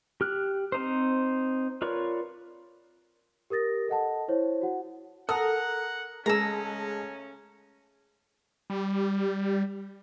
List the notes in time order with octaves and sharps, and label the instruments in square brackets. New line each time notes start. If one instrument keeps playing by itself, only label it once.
[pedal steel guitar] G4 F6 F#6
C4 D#4 C5
F4 A#4 B4 C#5 D5
[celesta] G4 A#4 D#6 A6 A#6
A4 D#5 F#5 A5
E4 C5 C#5
F#4 F#5
[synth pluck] A4 [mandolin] A#4 [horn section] F#5 [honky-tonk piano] D#6
[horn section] C#3 A3 C#4 [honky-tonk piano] G#3 G#4 A5 [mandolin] A#5 E6
[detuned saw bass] G3